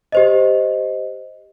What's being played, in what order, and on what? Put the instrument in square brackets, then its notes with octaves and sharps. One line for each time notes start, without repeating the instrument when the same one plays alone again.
[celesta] G4 C5 D#5